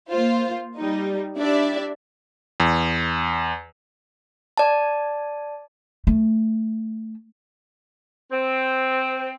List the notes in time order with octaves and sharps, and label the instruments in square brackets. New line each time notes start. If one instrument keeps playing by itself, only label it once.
[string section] A#3 F4 C5
G3 D#4
D4 E4 G4 D5 E5
[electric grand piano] E2
[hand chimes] D5 A5
[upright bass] A3
[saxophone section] C4